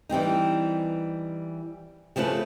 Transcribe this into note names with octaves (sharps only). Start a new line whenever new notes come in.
E3 G3 C4 D#4
C#3 F3 A3 C#4 B4